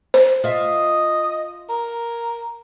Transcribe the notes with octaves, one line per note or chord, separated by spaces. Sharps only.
C5
F4 D#5 E5
A#4